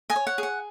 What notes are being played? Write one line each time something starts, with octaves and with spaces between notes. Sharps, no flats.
D#5 G#5
C#5
F#5
G#4 F#5